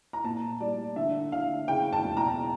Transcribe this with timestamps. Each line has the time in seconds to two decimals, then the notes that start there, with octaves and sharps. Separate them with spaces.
0.13 A#5
0.24 A#2 A5
0.60 G3 D5
0.96 D3 E5
1.32 D3 F5
1.68 C#3 G5
1.93 A5
2.04 E1
2.17 A#5